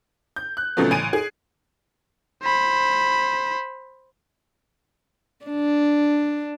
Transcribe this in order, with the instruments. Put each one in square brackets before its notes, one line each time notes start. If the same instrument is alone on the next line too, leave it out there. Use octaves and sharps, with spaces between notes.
[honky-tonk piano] G6
F#6
A#2 C#3 F3 F#3 A3 B3
A1 G#5 D7 D#7
G#4
[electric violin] C5 B5
[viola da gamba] D4